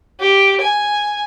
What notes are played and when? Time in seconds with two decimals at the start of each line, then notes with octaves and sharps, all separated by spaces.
0.20 G4
0.61 G#5